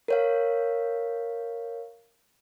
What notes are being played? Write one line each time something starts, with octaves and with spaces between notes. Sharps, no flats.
A#4 C#5 F5